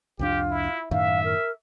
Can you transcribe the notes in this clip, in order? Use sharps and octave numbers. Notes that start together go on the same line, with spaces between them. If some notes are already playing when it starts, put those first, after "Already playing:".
C2 F2 D4 F4 G4
E4
F#2 A2 D#3 E5 F5
A#4